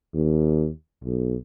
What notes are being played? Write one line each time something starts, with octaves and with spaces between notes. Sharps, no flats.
D#2
B1